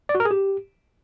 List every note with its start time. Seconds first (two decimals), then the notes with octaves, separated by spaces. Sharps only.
0.09 D5
0.15 F#4
0.20 A#4
0.25 G#4
0.31 G4